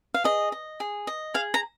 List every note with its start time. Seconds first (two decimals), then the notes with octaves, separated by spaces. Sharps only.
0.14 F5
0.24 G#4 D#5
0.52 D#5
0.80 G#4
1.07 D#5
1.34 G#4 F5
1.54 A#5